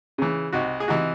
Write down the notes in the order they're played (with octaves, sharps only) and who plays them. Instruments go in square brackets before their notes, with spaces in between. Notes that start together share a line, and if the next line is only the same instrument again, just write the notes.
[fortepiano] C#3 E3
C2 D#4 F#4
G#4
C3 E3 D#4 F#4